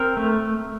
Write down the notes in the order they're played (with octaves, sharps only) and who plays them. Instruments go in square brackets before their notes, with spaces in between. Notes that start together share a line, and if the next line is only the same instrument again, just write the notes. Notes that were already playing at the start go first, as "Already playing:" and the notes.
Already playing: [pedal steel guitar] C4 A#4
A3